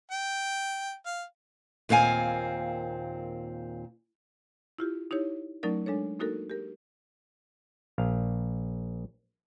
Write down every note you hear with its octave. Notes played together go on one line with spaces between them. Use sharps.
G5
F5
D#2 A#2 C4 F5 G#5
E4 F4 G4
D#4 E4 G4 C#5
F#3 A3 C#4 D#4 A#4 D5
G#3 D4 A4 C#5
A#3 D#4 F#4 A4 A#4
G4 A#4
A#1 F5